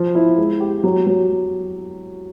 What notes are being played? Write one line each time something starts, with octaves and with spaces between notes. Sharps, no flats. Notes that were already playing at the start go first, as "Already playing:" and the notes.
Already playing: F3
E4
G#3
G4
F#3
F#3